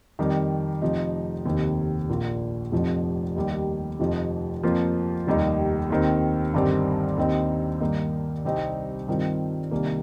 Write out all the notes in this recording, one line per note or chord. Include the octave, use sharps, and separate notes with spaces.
F2 D#3 G3
F1 F2 F3 D#4
F1 D#2 D#3 C4
A#1 A#2 A#3 F4
F1 F2 F3 D#4
D#2 D#3 G3
F1 F2 F3 D#4
F2 F3 A#3 F4
F1 D#2 D#3 G3 D#4
D#2 D#3 C4
G1 G2 D#3 G3 C4
D#2 D#3 C4 D#4
G2 D#3 A#3 D#4
C2 C3 G3 C4 D#4
G2 D#3 C4 F4
C2 C3 D#3 A#3